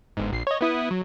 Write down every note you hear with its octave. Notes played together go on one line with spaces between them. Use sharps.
G1 G#2
A#1 C7
C#5 D#5
B3 E4 D#6
F#3